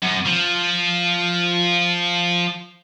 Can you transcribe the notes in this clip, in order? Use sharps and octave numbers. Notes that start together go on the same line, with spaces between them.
F#2
F3